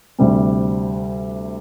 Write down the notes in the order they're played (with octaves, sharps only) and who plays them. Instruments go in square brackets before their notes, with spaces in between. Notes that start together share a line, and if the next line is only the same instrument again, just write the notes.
[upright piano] D2 C3 G3 C4